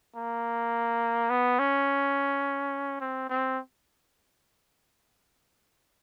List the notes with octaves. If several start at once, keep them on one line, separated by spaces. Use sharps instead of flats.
A#3
B3
C#4
C4
C4